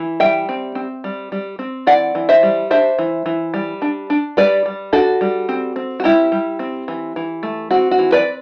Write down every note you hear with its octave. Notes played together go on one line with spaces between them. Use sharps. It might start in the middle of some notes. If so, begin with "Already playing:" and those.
Already playing: E3
G3 E5 G5
C4
C4
G3
G3
C4
E3 D5 F#5
E3
C5 E5
G3
D4 C5 E5
E3
E3
G3
D4
D4
G3 B4 D5
G3
D4 F#4 A4
G3
C4
C4
F#4
G3 E4 G4
G3
C4
E3
E3
A3
C4 F#4
F#4
E3
B4 D5